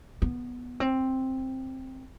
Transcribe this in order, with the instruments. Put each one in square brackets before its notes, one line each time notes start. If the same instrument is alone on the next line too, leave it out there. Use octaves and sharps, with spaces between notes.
[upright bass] B3
C4